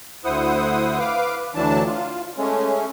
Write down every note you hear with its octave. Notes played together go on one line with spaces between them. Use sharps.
D2 E4 C5 F#5 D#6
B4 F5 D6
D2 E3 F#3 D4 A5
F4
G#3 A3 C#4